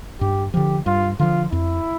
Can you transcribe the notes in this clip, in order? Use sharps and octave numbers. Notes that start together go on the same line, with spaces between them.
G2 G4
D3 F3 G4
G2 F4
D3 F3 F4
F2 E4